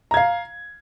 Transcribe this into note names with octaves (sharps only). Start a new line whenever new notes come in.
F5 A#5 G#6